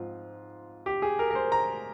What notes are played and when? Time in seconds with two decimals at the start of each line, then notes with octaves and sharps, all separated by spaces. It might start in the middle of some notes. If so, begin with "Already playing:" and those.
Already playing: G#2 F3 C4 F4
0.86 G4
1.02 G#4
1.19 A#4
1.31 A#4
1.35 C5
1.52 A#5